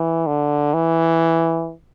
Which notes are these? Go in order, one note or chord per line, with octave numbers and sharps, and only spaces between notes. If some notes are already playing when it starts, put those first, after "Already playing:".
Already playing: E3
D3
E3